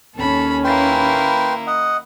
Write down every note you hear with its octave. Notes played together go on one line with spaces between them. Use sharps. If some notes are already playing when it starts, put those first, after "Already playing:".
D#2 C#4 A4 B5
A#3 E4 B4 G5 C6
D#5 F#5